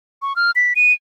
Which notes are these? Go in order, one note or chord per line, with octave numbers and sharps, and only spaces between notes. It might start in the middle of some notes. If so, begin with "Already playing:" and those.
C#6
F6
B6
D#7